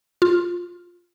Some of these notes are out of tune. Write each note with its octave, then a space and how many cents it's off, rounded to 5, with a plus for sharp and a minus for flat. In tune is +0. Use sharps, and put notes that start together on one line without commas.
F4 +5